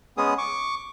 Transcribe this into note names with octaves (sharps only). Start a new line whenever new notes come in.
G#3 B3 C#4 G#4 D#6
C#6 D6